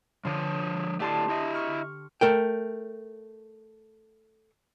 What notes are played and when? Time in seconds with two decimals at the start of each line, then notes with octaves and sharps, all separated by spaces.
0.25 D3 F3 C#5 A5
1.00 A3 D4 E4 G4 A5 C6
1.29 E4 D#5 E5
1.54 C#6 F6
2.21 A3 A#4 G5